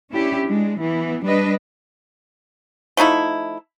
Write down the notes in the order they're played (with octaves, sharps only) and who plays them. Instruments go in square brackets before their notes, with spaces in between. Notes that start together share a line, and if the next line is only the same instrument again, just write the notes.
[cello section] C#4 D4 E4 G4
G#3 D4
E3 B3
G3 D4 B4 D#5
[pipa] F3 A3 D#4 E4